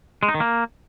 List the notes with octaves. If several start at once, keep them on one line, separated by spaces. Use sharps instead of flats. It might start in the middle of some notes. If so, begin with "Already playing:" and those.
G#3
D#4
D#3
A#3